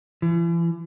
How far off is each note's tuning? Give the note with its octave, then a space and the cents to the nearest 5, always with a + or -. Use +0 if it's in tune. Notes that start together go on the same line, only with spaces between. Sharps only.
E3 +40